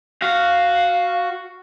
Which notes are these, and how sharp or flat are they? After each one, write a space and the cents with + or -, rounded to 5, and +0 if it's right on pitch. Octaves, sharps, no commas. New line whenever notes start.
F#4 +0 F5 +0